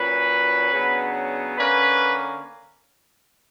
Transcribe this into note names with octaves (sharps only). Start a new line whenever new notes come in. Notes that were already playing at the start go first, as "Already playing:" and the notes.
Already playing: A#2 F#3 C#4 B4
C#3 F#3 B3 D4
D3 A#3 C#4 B4